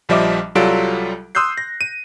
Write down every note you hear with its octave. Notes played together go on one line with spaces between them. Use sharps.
A#1 F3 G3 D#5 E5 D6
C2 F#3 G3 F4 A4 D7
C6 D#6 E6 F#6 G6 C7
A#6
D#7